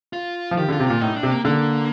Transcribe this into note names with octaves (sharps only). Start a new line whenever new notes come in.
F4
F3
D#3 G4
D3
F4
C3
A#2 F4
A2 D#4
D4
C3
A#3
D3 A#3